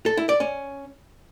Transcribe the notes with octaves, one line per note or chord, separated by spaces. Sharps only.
A4
E4
D5
C#4